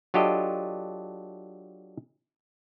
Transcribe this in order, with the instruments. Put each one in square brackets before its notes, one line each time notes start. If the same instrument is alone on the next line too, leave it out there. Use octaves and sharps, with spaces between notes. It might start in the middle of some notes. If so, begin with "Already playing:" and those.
[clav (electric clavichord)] F#3 D4 F4 G4 A4 D#5